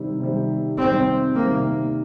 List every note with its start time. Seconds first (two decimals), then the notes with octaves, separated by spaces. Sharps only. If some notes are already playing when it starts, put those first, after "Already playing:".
Already playing: C3 D#3 G3
0.20 C3 D#3 G3
0.77 C3 D#3 G3 C4
1.35 C3 D#3 G3 A#3